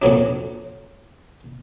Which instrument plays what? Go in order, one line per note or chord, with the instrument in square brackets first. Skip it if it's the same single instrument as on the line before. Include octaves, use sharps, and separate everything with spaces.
[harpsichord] F2 A#2 F#3 D4